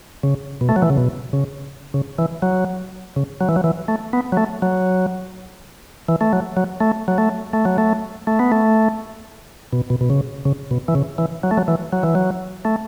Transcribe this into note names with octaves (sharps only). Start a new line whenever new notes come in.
C#3
B2
A3
F#3
E3
C#3
B2
C#3
C#3
E3
F#3
C#3
F#3
E3
F#3
E3
A3
B3
F#3
A3
F#3
E3
A3
F#3
F#3
A3
F#3
A3
A3
F#3
A3
A3
B3
A3
B2
B2
B2
C#3
C#3
B2
E3
C#3
E3
F#3
A3
F#3
E3
F#3
E3
F#3
A3